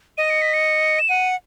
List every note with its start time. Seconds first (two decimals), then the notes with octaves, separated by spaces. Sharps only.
0.18 D#5 D#7
0.30 C#7
0.42 B6
0.54 C#7
0.99 E7
1.09 F#5 D#7